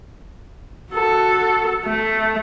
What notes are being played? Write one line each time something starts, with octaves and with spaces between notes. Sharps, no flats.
F#4 A4
A3